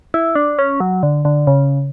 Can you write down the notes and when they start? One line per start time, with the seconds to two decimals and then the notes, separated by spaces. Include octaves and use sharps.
0.14 E4
0.35 D4
0.59 C#4
0.80 F#3
1.03 D3
1.25 D3
1.47 C#3